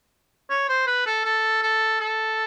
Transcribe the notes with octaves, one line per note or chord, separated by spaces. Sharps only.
C#5
C5
B4
A4
A4
A4
A4